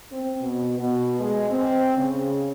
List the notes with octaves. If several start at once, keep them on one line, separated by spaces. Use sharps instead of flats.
C4
B2
B2
G#3
C4
C#3